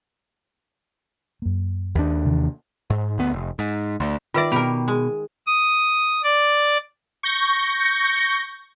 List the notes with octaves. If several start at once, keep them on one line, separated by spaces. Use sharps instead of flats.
F#2 A#3
D#2 D4
C3 D#3 E3
G#2
D2 B3
F1
G#2
D2
D#3 F4 B4 D5 E5
B2 G4 A#4 B5
G#3
D#6
D5
C#6 G6 A#6